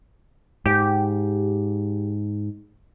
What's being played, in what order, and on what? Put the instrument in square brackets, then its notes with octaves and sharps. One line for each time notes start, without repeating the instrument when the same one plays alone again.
[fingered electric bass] G#2 [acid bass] G4